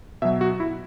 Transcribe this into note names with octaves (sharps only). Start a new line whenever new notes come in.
B2 F#3 E5
F#4
E4